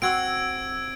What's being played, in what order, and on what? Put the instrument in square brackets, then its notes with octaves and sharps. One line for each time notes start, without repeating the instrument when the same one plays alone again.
[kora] C4 F#4 [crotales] E6 G#6 D7